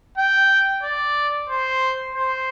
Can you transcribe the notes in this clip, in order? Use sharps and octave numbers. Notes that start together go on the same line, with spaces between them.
G5
D5
C5
C5